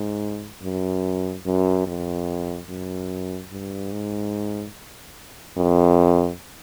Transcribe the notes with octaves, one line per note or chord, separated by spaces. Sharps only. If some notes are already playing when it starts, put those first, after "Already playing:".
Already playing: G#2
F#2
F#2
F2
F#2
G2
G#2
F2